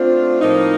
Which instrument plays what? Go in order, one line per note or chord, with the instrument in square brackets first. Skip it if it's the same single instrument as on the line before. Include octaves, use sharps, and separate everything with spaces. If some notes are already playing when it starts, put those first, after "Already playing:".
Already playing: [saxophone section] A3 D4 F4 [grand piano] C4
[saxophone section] A2 F3 A#3 D#4